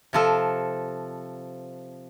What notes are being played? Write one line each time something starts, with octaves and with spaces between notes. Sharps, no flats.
C3 F3 A4